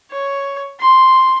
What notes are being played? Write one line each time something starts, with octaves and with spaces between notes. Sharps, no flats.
C#5
C6